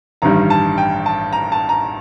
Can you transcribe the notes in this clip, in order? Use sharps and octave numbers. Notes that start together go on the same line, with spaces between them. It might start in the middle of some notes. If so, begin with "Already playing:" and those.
A1 G2 D#3 G3 A#5
A5
G5
A5
A#5
A5
A#5